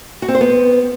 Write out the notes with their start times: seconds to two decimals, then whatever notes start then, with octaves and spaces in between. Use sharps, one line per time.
0.22 F#4
0.28 C4
0.35 C5
0.41 B3